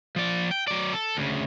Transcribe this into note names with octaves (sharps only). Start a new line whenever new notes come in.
F3 D5
G5
F#3 D5
A4
D2 C#3